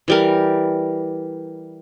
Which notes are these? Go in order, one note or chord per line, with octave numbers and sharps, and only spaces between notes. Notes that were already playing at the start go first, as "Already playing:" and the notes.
E3 G3 A#4